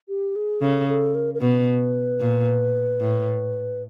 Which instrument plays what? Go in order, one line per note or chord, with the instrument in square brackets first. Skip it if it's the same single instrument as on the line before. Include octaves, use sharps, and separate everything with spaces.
[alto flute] G4
G#4
[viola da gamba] C#3 [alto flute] A4
[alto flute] A4
A#4
A#4
[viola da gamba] B2 [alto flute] B4
[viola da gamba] A#2
A2